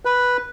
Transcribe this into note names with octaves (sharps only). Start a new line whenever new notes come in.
B4